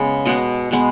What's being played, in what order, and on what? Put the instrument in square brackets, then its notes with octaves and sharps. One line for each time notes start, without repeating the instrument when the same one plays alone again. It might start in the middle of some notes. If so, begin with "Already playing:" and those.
Already playing: [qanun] C#3 G#3 B3
B2 G#3 B3 D#5
B2 G#3 B3